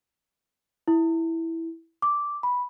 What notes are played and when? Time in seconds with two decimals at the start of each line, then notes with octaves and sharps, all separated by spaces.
0.88 E4
2.02 D6
2.43 B5